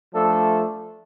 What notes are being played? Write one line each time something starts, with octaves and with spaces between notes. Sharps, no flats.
F3 A3 D4 A4